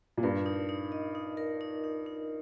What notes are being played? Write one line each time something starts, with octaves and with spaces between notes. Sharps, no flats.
A#2
G2 A#4
D#4
D#4
D#5
D#4
A#4
D#4
D#4
D#4